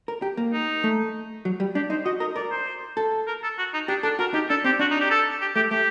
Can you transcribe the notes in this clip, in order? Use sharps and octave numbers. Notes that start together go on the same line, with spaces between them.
A#4
G4
A#3
D#4
A3
F#3
G3
D4 G4
D#4 C5
F#4 D#5
A#4 D#5
A#4 D5
C5
A4
A#4
A4
F#4
D#4
D4 G4
D4 A4
F#4 A#4
D#4 G4
D4 A4
C4 G4
D4 F#4
D#4
G4
A4
G4
A3 G4
A3 G4